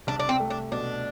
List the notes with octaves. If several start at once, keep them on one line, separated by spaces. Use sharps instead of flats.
C2 D4
D4
C4
A3
D4
B2 D4